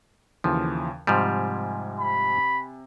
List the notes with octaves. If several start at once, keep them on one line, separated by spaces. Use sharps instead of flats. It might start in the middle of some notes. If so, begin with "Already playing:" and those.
D#2 C#3 E3 F3
G#2 C3 F3 G3 G#5
B5